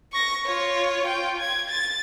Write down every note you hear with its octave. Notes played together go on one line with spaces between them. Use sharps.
C#6 A#6
F4 C#5
F4 G5
G#6
A6